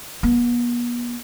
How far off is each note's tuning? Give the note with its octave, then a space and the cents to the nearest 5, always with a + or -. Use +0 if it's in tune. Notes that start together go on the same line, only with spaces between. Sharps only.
B3 -45